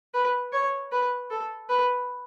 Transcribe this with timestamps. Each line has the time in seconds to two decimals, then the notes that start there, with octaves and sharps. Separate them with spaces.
0.14 B4
0.53 C#5
0.92 B4
1.30 A4
1.69 B4